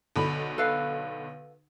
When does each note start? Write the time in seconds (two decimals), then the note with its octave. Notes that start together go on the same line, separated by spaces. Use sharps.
0.16 B1 D3 B5
0.58 A4 B4 F5